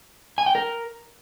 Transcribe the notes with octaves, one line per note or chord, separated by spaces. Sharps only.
G#5
G5
A#4